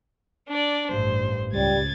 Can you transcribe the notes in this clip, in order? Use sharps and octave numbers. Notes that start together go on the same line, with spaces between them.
D4 D5
A1 G2 C5
C#2 G3 G#6 A6